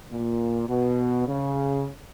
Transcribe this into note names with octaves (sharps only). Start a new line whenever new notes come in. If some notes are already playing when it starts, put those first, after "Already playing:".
A#2
B2
C#3